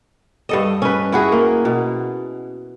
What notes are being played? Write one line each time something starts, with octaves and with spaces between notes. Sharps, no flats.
G2 A4 D#5
C#4 B4
E4 F#4 G#4
A#3
B2